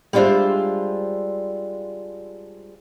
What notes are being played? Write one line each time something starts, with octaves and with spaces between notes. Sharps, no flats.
G3 G#3 D4 F4 C5 E5